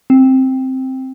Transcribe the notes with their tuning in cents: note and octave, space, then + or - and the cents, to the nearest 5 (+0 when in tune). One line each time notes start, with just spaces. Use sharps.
C4 +5